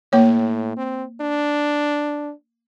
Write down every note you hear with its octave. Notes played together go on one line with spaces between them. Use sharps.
A2 A#3 C#5
C4
D4